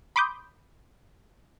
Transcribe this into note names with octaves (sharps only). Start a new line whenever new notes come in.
B5 C6 D6 D#6 G6